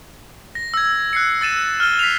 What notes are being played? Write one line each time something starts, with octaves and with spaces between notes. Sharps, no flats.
A#6
E6 G#6
F#6 C7 C#7
E6 A6 D#7 E7
F6 G7
B6 C7 F7